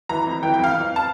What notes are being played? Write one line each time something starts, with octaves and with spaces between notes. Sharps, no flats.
E3 A#5
F2
E3 G5
G5
F2
F5
F2
A5